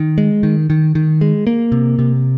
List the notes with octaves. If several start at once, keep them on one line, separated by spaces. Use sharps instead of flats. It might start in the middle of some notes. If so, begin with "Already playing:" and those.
Already playing: D#3
G#3
D#3
D#3
D#3
G#3
A#3
C3
C3